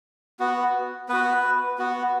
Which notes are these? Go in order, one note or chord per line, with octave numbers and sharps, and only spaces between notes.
B3 F#4
B3 F#4 B4
B3 F#4